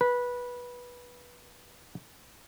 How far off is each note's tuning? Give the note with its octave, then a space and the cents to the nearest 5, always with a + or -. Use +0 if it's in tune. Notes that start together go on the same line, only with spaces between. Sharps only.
B4 -15